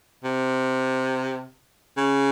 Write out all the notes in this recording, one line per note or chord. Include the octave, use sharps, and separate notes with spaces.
C3
C#3